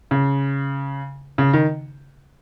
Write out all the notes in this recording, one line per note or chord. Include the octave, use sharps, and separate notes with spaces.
C#3
C#3
D#3